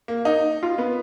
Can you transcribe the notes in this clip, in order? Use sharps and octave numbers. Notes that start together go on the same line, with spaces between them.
A#3
D#4
F4
B3